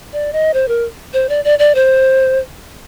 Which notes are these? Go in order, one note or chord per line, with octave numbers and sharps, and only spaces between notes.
D5
D#5
C5
A#4
C5
D5
D5
D5
C5